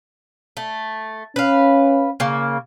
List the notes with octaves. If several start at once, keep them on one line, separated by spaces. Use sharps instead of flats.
A3
C#4 B4 F5
C#3 A#3